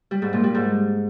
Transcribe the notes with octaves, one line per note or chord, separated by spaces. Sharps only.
G3
G#2
A#2
G3
G#2